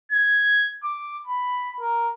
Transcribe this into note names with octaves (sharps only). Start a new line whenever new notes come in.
G#6
D6
B5
A#4